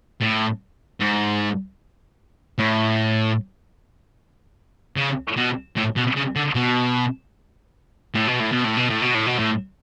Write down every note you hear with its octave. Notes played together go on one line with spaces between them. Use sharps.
A2
G#2
A2
C#3
B2
A2
B2
C#3
D3
B2
A2
B2
A2
B2
A2
B2
A2
B2
A2
B2
A2